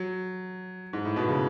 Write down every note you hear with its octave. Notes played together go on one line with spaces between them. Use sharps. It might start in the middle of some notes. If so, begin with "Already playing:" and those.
Already playing: F#3
G#2
A2
B2
C#3